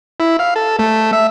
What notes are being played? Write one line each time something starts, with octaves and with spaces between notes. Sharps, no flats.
E4
F5
A4
A3
E5